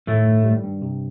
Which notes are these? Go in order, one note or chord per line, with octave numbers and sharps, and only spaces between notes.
A2 D#3 A3
G2
G3
G2
C3